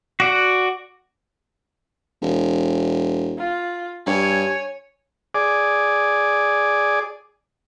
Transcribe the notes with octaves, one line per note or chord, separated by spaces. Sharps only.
F#4 D5 F#5
E1
F4
G2 C#5 G#5
G#4 D5